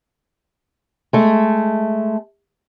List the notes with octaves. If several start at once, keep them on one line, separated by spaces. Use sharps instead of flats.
G#3 A3